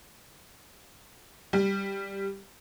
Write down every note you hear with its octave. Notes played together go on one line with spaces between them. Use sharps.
G3